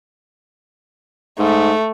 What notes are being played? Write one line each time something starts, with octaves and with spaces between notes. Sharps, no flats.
G#2 A3